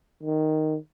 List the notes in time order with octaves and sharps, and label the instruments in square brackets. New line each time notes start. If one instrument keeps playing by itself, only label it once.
[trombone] D#3